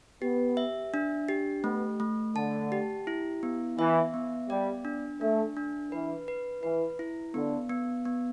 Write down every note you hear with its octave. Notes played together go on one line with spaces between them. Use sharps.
B3 G4
E5
D4
G4
A3 B3
A3
D3 A5
G4
E4
B3
E3 E5
B3
G3 D5
D4
A3 D4
D4
E3 B4
B4
E3 B4
E4
D3 B3
B3
B3